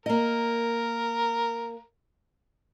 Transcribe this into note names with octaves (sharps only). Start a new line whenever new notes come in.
A#3 A#4 D#5